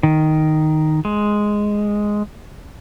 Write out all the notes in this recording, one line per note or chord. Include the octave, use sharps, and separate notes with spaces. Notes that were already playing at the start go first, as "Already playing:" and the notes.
D#3
G#3